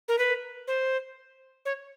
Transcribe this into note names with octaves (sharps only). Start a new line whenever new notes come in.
A#4
B4
C5
C#5